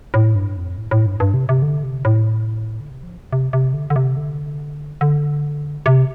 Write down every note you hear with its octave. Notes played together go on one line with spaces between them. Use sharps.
A2
G2
F2
A2
A2
G2
G2
C3
C3
D3
C3
A2
D3
C3
F3
C3
C3
D3
D3
C3
D3
D3
C3